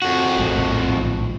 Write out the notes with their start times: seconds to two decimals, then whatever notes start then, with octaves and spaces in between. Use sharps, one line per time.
0.02 F2 F#4
0.38 A#1 A2 G#3